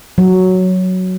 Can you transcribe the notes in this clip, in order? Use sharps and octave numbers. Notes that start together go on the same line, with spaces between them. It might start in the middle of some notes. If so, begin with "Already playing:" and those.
F#3